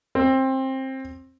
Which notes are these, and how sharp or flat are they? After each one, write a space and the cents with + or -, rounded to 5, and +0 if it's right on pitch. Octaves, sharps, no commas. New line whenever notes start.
C4 +20